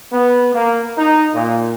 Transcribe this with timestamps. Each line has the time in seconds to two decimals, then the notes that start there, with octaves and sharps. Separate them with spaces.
0.13 B3
0.55 A#3
0.98 D#4
1.34 A#2